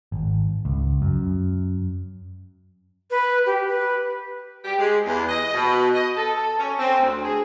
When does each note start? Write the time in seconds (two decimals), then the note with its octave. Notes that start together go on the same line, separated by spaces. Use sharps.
0.12 G#1
0.65 C#2
1.02 F#2
3.11 B4
3.46 G4
3.68 B4
4.65 G4
4.79 G#3
5.06 E2
5.29 D#5
5.54 B2
5.95 D#5
6.17 A4
6.58 C#4
6.79 C4
6.98 D2
7.24 G#4